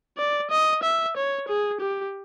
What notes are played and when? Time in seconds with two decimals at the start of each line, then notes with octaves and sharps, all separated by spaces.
0.18 D5
0.51 D#5
0.83 E5
1.16 C#5
1.48 G#4
1.81 G4